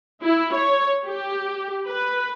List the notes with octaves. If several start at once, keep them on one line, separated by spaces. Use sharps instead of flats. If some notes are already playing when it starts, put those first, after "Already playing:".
E4
C#5
G4
B4